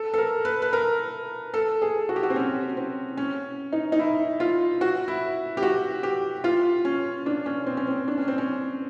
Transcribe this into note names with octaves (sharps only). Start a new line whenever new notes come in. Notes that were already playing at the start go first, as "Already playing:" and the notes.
Already playing: A4
A4
A#4
B4
B4
A#4
A4
G#4
F#4
G4
F#4
C4
C#4
C4
C#4
D#4
D#4
E4
F4
F#4
E4
G4
F#4
G4
F4
C#4
D4
C#4
C4
C#4
C4
D4
C#4
C4
C#4